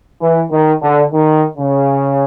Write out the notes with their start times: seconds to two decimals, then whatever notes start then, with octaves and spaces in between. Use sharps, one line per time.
0.22 E3
0.51 D#3
0.83 D3
1.12 D#3
1.58 C#3